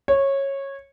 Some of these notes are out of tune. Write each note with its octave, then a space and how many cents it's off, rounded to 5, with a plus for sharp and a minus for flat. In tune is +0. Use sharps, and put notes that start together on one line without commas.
C#5 -15